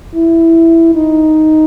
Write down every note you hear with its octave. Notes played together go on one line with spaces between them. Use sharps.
E4
D#4